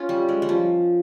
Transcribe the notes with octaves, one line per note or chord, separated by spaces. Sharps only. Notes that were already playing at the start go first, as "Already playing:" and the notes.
Already playing: C#4 F4
G3
G#3
G3
F3